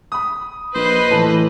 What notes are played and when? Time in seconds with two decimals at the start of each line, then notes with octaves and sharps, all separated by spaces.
0.12 B5 D#6
0.75 A#1 B4 C5 D#5
1.11 A2 E3 A5